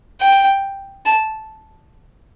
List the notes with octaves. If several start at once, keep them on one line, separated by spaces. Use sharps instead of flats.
G5
A5